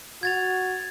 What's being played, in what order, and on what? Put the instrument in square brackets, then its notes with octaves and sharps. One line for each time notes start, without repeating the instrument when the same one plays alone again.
[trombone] F#4 [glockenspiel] G#6 A6 F7